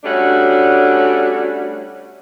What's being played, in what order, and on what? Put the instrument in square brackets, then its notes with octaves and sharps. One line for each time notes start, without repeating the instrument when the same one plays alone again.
[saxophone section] G3 A3 C#4 D4 F#4